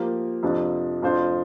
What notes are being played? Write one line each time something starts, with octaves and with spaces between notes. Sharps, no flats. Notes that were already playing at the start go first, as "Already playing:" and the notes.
Already playing: F3 A#3 G4
F2 C3 F3 D4
F2 F3 D4 F4 C5